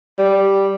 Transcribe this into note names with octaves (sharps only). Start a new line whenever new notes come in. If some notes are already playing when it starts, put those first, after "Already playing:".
G3